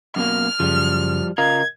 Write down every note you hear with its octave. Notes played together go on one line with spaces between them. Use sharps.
F#2 B2 A#3 F6
F#2 C#3 F3 G3
C#3 F4 A#4 D#5 F5 A#5 G#6